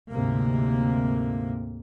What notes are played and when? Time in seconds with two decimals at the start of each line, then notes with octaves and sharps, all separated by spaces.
0.11 D2 G#2 C3 A#3